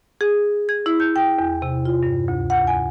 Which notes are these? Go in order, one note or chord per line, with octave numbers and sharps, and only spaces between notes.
G#4
G#6
E4
G6
G5
E2
C3
F4
G2
D2
F#5
G#5